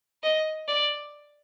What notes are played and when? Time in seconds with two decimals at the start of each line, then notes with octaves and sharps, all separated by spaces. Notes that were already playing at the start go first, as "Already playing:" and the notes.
0.23 D#5
0.68 D5